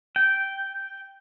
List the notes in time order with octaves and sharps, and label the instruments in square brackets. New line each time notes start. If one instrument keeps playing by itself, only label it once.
[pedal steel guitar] G5